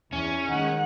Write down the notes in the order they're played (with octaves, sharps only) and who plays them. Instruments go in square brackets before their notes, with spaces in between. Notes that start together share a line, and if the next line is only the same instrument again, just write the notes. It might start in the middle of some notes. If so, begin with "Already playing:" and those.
[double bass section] E2 [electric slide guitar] C#4
[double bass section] D#3 G#3 [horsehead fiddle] F#5